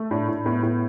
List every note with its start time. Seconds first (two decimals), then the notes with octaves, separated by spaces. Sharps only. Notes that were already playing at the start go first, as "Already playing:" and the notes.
Already playing: A3
0.11 A2 D4
0.28 A2
0.45 A2 B3
0.63 A2